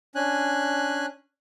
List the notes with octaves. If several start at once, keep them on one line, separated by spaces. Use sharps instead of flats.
C#4 D4 G#5 F#6